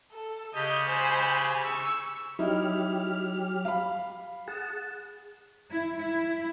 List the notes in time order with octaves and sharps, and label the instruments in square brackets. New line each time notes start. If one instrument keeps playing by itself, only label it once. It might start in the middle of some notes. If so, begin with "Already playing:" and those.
[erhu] A4
[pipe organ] C#3 G4 [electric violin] D#5 [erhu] G6
[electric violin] C5 B5 [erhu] G#5
[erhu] C#6 [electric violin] E6
[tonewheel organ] F#3 G4 F6 [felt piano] D#4 E4
[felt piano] F5 B5
[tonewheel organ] G#4 F#5 A5
[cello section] E4
E4